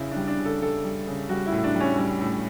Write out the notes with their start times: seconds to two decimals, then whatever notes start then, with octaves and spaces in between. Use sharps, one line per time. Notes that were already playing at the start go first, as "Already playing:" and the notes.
Already playing: C#3 E4
0.11 G3 D4
0.27 D4
0.40 C#3
0.45 A4
0.61 G3 A4
0.84 G3
1.07 C#3
1.29 G3 F#4
1.47 E4
1.52 A2
1.64 D4
1.75 G3
1.80 C#4
1.97 G3 C#4
2.21 A2